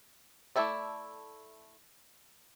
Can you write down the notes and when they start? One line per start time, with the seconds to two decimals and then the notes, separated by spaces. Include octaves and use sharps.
0.56 A3 D4 E4 A4 D5